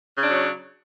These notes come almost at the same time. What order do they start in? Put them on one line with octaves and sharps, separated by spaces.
C#3 D4 F#3